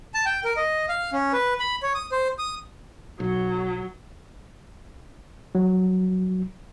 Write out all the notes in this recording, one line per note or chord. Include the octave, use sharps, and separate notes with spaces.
A5
G5
A#4
D#5
F5
C#4
B4
B5
C#5
D#6
C5
D#6
B1 F#3
F#3